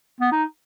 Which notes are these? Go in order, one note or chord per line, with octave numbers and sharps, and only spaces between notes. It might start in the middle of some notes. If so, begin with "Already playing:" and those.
B3
D#4